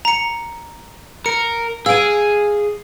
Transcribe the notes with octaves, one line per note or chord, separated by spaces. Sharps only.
A#5 C#7
A#4 C#7
G#4 F5 G#5 E6 D7